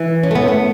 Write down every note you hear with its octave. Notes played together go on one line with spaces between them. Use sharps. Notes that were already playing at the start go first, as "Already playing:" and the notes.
Already playing: E3
C#4
A3
B3
A3